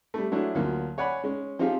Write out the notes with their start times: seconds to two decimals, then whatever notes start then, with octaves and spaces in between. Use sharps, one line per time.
0.14 G3 A3
0.32 F#3 G#3 A3 D4 E4 G#4
0.55 D2 F3 F#3 A#3
0.98 C#5 D5 F#5 G#5 B5
1.24 G#3 C#4
1.59 F3 C4 D#4 F4 G4 G#4